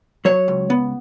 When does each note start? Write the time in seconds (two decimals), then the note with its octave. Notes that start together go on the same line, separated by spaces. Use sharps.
0.25 F#3 C#5
0.48 C#2
0.70 B3